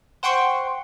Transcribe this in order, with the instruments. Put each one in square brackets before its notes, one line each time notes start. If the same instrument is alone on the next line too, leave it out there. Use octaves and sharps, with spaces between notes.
[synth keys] C5 F#5 G5 C6 C#6